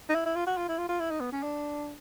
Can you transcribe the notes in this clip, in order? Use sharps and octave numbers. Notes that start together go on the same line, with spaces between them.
D#4
E4
E4
F4
F#4
F4
E4
F4
F4
E4
D#4
B3
C#4
D4